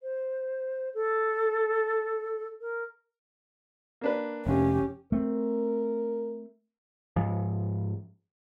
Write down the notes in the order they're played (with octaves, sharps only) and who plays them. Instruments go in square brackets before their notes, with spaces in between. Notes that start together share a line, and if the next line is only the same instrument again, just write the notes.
[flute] C5
A4
A#4
[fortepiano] A#3 D4 B4
[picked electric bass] F1 [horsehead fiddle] C#4 G4
[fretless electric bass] A3 C4 [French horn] A#4
[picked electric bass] G#2 F3 G#3